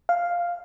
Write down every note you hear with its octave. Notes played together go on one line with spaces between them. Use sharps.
F5